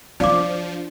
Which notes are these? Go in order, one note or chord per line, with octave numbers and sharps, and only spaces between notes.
F3 D4 D5 F5 D6